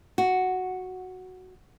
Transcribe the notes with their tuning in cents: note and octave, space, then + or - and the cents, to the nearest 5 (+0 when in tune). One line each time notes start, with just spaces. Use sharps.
F#4 +0